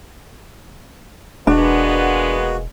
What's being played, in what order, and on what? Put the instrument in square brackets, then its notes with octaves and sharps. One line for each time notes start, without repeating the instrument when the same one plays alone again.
[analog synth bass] E1 [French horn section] G#3 A#3 B3 [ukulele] D4 [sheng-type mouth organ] F#4